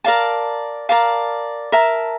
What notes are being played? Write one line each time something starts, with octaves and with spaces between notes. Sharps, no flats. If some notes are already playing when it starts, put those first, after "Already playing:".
A#4 D5 F5 A5
A#4 D5 F5 A5
A#4 E5 A5